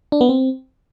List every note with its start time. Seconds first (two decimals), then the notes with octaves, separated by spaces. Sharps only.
0.12 D4
0.21 B3
0.29 C4